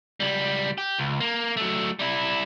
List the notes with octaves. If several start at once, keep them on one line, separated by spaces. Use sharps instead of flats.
C#2 G3
G4
C#2
A#3
F#3 A3
G3 E4